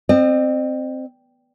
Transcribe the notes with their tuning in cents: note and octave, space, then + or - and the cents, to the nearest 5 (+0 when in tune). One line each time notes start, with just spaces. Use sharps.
C4 +0 D#5 -45